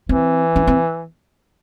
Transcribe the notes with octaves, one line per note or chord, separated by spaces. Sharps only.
E3 C4
C#4
C4